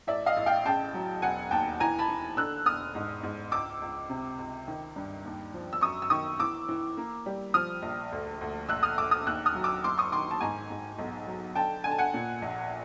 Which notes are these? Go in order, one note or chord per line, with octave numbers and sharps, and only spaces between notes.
A1 D5 E5
D#5 F5
A1
F5 G5
C#3 G5 A5
F#3
E1 F#5 G#5
D#2 G5 A5
E3 G#5 A#5
A5 B5
E3
D3 E6 F#6
E1 D#6 F6
G#2
G#2
C#2 D6 E6
C#2
C3
C#2
D#3
G2
D#2
F3
E6
F#2 C#6 D#6
E6
D#3 C#6 D#6
E3 D6 E6
E3
A#3
G3
F3 D#6 F6
A#1
D2
D2
A#1 E6 F#6
D#6 F6
A#1 D6 E6
D#6 F6
D#2 E6 F#6
D#6 F6
F#3
D6 E6
F#1 C6 D6
C#6 D#6
D#3 C6 D6
A5
G#2 G#5 A#5
G#2
B1
F#3
D3 G5 A5
D3 G#5
A5
F#5 G#5
A#2
A#1